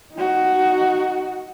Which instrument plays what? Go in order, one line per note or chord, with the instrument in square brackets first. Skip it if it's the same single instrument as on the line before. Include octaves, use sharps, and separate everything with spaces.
[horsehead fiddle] D#4 F#4